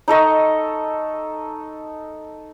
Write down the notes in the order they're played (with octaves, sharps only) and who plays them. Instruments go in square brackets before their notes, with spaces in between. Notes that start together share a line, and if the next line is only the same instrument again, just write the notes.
[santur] D#4 A4 D#5 C#6